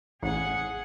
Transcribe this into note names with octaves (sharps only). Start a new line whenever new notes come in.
A1 G#4 F#5